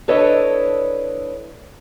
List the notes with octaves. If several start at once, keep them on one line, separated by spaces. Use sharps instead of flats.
D4 E4 A4 B4 C#5 D#5